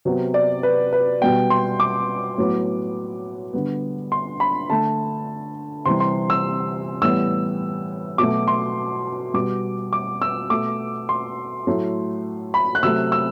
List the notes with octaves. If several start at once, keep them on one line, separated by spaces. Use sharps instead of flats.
C3 F#3 B3
D5
B4
B4
B2 G3 B3 G5
C6
D6
A2 F#3 B3
D3 G3 B3
C6
B5
D3 A3 A5
C3 E3 G3 C6
C6
E6
A2 E3 G3 B3 E6
B2 F#3 A3 D6
C6
B2 G3 B3 D6
D6
E6
B2 A3 D6
C6
A2 F#3 A3
B5
F#6
C3 F#3 A3 E6
E6